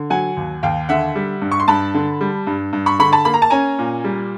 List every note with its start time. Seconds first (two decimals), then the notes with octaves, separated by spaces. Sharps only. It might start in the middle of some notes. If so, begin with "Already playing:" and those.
Already playing: D3
0.10 F#3 F#5 G#5
0.37 D#2
0.63 D#2 F5 G5
0.89 D3 E5 F#5
1.15 G3
1.42 G2
1.52 C#6
1.60 C6
1.68 G2 A5 B5
1.95 D3
2.21 G3
2.47 G2
2.73 G2
2.86 B5 C#6
2.99 D3 B5 C#6
3.12 A5 B5
3.25 A#3 B5
3.34 A#5
3.42 A5
3.50 C#4 G#5 A#5
3.79 A#2
4.04 G3